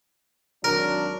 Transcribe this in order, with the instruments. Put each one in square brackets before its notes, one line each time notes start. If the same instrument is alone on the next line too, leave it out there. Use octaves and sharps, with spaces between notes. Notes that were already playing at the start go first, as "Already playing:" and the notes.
[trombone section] G#1 F#3 D4 [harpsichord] A#4